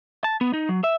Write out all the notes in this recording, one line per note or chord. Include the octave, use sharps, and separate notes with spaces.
A5
B3
D#4
F#3
E5